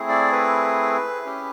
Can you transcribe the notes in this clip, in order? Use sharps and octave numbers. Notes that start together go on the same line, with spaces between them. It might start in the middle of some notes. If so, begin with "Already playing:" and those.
Already playing: A3 C4 E4 G#4
D5
B4
C#4 E4 G4